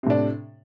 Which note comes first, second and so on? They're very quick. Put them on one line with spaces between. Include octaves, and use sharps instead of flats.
C3 A2 D4